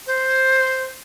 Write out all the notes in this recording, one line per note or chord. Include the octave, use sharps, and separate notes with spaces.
C5